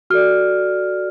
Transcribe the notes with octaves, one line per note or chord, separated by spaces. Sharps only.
F#4 A4 D5 F6